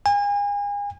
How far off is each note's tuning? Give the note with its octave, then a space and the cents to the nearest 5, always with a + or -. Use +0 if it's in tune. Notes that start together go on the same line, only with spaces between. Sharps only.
G#5 -35